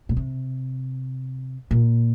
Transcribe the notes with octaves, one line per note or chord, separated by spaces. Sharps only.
A#2
C3
A#2